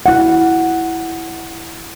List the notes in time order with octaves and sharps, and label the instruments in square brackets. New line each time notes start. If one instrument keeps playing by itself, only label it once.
[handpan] E4 F#5